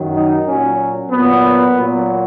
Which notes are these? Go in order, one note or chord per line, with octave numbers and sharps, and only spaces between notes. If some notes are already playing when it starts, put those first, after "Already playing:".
Already playing: F#2 D#3 F#3
D#4
A#2 F#3 C#4
A#2 F#3 B3
A#2 F#3